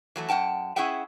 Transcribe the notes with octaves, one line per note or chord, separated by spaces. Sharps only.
E3 F#3 A3
F#2 F#5 G5 A5
C#4 E4 G#4 E5 F#5 G5